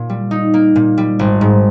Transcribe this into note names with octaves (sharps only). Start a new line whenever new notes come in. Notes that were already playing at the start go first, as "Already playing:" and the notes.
Already playing: A#2
G3
D#4
A#3
A#2
G3
G#1
G#2